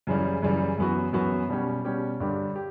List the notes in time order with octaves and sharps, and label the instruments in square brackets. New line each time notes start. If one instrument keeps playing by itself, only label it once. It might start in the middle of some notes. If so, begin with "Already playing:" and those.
[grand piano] F#2 C#3 E3 G3
F#2 C#3 E3 G3
F#2 E3 B3 F#4
F#2 E3 B3 F#4
B2 G3 C#4 G4
B2 G3 C#4 G4
G2 D3 G3 D4 G4
G4